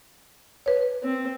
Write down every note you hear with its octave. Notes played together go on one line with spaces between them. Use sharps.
B4 C#5
C4